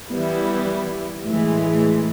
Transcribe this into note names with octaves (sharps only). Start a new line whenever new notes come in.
E3 G3 B3 E4
A2 E3 G#3